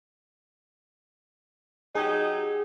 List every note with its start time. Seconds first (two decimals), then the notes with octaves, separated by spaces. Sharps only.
1.95 F#3 D#4 G4 G#4 G#5